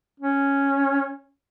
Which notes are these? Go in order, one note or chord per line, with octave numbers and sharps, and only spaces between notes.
C#4